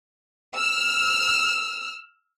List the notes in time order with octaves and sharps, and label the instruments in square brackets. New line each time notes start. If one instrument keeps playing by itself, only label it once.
[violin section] E6 F6